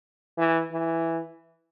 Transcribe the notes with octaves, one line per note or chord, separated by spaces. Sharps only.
E3
E3